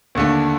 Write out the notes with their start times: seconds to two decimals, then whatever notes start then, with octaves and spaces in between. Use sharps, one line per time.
0.15 D#2 D3 A3